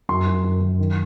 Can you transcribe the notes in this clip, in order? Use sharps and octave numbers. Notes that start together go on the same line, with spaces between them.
F#2 C6
F#2
F#2
F#2
D#3